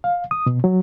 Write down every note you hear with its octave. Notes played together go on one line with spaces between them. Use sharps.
F5
D#6
B2
F#3